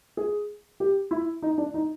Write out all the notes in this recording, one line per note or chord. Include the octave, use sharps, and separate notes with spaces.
G#4
G4
E4
D#4
D4
D#4